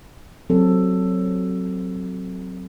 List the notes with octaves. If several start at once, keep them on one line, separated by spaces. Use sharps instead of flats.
F#3 C4 A4